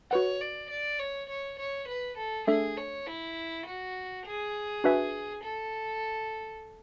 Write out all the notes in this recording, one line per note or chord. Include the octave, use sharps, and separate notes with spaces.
F#4 B4 C#5 F#5
D5
D5
C#5
C#5
C#5
B4
A4
A3 D4 G#4 A4 E5
C#5
E4
F#4
G#4
D4 F#4 B4 E5 G#5
A4